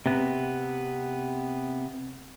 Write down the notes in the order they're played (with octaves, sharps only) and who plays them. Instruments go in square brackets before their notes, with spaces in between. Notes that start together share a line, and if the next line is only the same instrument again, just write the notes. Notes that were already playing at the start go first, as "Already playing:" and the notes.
[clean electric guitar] C3 B3